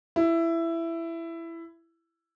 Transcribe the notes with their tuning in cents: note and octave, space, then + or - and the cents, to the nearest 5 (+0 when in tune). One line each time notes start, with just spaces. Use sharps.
E4 +15